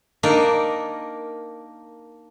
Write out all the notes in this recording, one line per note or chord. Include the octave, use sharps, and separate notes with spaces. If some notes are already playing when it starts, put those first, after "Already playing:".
A#3 D4 D#4 A#4